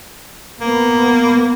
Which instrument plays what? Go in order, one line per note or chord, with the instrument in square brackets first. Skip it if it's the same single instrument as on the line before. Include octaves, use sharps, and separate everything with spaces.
[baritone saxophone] A#3 [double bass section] B3